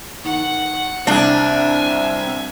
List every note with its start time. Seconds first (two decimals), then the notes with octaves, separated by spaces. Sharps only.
0.24 D#3 F#5
1.07 C2 C4 D4 E5 G#5